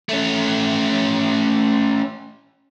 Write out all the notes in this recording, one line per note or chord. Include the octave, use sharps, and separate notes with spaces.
A3 C#4